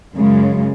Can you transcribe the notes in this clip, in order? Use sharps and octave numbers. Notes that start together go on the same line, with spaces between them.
F#2 C#3 G#3